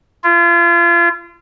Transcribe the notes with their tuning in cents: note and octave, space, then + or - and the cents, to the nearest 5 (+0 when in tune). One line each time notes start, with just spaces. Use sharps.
F4 -35